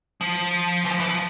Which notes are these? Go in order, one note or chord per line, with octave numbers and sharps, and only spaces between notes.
F3
E3
F3
E3
F3